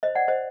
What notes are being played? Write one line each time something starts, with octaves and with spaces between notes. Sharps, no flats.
C5 D#5
D5 F#5
C5 D#5